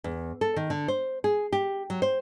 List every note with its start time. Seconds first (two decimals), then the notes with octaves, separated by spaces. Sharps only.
0.04 E2
0.41 A4
0.56 D#3
0.70 D3
0.88 C5
1.24 G#4
1.52 G4
1.90 F#3
2.02 C5